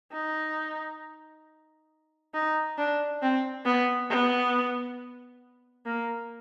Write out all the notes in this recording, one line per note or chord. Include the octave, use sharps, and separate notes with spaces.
D#4
D#4
D4
C4
B3
B3
A#3